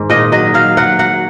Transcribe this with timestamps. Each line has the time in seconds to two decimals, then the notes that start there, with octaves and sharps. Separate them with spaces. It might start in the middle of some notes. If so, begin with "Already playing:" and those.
Already playing: G#2 D#3
0.10 A#2 D#5
0.32 F#3 D#5
0.54 F#3 F5
0.77 F#3 F#5
0.99 F#3 F#5